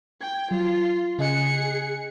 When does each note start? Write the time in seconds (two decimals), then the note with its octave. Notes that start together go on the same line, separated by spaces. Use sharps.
0.21 G5 G#6
0.51 F#3 F4
1.19 C#3 G#4 D#5 F#6 C#7